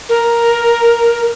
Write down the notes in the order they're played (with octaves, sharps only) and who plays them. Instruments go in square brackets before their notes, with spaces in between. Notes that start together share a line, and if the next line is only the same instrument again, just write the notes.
[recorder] A#4